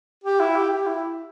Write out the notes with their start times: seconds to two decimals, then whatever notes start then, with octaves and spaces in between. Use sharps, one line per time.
0.23 G4
0.40 E4
0.55 G4
0.71 G4
0.86 E4